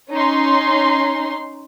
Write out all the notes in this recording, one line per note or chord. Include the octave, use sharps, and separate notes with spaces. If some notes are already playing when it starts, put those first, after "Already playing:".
C#4 D#4 C6